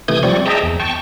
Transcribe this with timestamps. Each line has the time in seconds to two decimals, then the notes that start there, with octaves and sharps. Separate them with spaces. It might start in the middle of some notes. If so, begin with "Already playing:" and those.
0.08 C3 E3 A3 D#6 G6 G#6
0.23 F3 G3 C4 D5 C#6
0.46 G#4 D#5 E5 G5 A5 A#5
0.63 E2
0.80 G5 A5 C#6